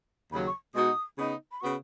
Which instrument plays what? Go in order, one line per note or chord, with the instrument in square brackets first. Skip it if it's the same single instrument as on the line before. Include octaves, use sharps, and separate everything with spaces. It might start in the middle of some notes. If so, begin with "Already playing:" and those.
[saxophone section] D#2 C#3 F#3 [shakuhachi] B5
[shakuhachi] C#6
[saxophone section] B2 G#3 D#4 F#4 [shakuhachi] D#6
[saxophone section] C#3 B3 D#4
[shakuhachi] B5
[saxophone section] C#3 B3 F#4 [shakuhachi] C#6